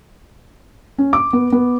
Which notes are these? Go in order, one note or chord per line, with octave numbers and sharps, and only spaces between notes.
C#4
D6
B3
B3